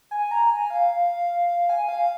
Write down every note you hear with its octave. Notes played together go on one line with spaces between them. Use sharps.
G#5
A#5
G#5
F5
G#5
F5